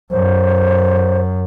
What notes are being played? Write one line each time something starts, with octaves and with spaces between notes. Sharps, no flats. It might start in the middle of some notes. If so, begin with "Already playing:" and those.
F#2 C5